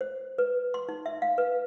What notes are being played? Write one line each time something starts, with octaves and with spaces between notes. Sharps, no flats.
C5
B4
C6
D#4
E5
F5
B4